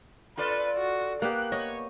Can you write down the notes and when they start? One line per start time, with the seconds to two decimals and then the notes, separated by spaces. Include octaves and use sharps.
0.37 F4 A4 B4 D5
0.78 F#4
1.22 A#3 B3 G4 F#6
1.52 C#5 D#5